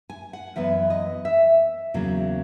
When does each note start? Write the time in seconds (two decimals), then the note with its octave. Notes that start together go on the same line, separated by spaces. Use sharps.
0.10 G#5
0.33 F#5
0.56 F#2 E3 B3 E5
0.90 D#5
1.25 E5
1.94 E2 C#3 F#3 A#3